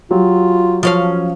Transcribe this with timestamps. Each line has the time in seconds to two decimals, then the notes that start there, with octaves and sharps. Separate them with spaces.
0.11 F#3 F4 G4
0.83 F3 C#4 F5